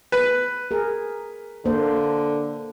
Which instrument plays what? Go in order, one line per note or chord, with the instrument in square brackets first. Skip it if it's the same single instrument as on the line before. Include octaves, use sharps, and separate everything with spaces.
[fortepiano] B4
[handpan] G#4 A#4
[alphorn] D3 [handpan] A#3 C5